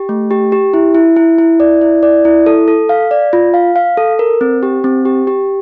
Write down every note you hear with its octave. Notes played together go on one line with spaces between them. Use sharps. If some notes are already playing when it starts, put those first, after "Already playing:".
Already playing: G4
A3
G4
G4
E4
E4
E4
E4
D5
E4
D5
E4
A4
A4
F5
D5
F4
F5
F5
A4
A#4
C4
G4
C4
G4
G4